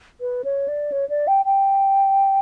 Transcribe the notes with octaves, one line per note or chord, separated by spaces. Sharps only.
B4
C#5
D5
C#5
D5
G5
G5